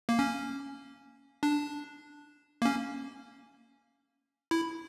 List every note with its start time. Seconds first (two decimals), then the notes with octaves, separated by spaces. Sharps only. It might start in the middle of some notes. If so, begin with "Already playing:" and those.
0.09 A#3
0.19 C#4
1.43 D4
2.62 A#3
2.65 C#4
4.51 E4